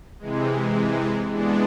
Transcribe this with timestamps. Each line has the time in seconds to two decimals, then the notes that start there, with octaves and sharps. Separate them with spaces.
0.19 C3 E3 G#3
1.31 E3 G#3 B3 D4